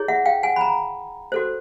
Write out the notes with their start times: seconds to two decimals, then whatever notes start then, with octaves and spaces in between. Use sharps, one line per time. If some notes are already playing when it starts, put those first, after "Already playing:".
Already playing: E4 G#4 C#5
0.08 E5 F#5
0.25 F5 G5
0.43 F#5 G#5
0.56 B5
0.61 G#5 A#5
1.32 F#4 A4 C5